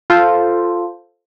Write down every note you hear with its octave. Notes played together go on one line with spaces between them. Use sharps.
F4 A4 C5